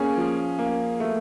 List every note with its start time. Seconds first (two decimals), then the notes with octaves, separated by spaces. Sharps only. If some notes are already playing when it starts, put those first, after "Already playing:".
Already playing: A#3 C#4 G#4
0.17 F3
0.59 A#3
1.00 A3